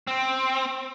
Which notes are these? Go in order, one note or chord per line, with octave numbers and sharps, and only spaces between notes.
C4